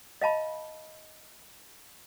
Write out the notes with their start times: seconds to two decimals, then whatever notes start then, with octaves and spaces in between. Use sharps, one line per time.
0.22 D#5 F5 A5 B5